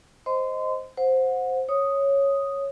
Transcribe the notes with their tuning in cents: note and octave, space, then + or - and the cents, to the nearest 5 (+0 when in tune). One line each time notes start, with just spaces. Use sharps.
C5 +0 D#5 +0 C6 -30
C5 +0 F#5 -25
C#5 -5 D#6 +0